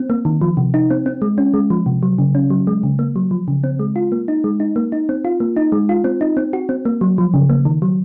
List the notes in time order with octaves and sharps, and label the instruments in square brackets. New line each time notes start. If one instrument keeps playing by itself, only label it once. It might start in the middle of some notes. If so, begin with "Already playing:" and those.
Already playing: [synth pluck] C4
A#3
D#3
F3
C3
D#4
C4
C4
G#3
C#4
G#3
F3
C3
F#3
C#3
C#4
F#3
G#3
C#3
A#3
F#3
F3
C#3
C4
G#3
F4
A#3
D#4
G#3
D#4
A#3
D#4
C4
F4
A#3
D#4
G#3
F4
C4
D#4
C4
F#4
C4
A#3
F#3
F3
C#3
A#3
D#3
F#3